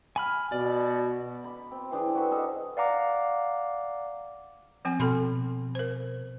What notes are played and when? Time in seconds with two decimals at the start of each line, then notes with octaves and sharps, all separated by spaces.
0.16 G#5 B5 F6
0.52 B2 D5
1.44 B5 D6
1.72 C4
1.91 E3 C4 D4 G#4
2.15 F#4 A4 B4
2.31 D4 G#4 A4 D#5
2.77 D5 F5 F#5 A#5 D6
4.85 F3 C4 G#5
5.00 B2 A4 B5 C6
5.75 A#4 C5